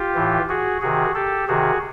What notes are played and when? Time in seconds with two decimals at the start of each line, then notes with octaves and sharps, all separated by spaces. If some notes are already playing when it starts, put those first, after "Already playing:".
Already playing: F4 G4
0.15 A2 E3
0.49 F#4 G#4
0.81 C3 D#3 F#4 G#4
1.14 G4 A4
1.48 C3 D#3 F#4 G#4